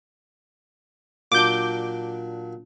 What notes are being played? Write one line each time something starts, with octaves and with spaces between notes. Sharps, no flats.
A#2 F#3 D4 D6 G6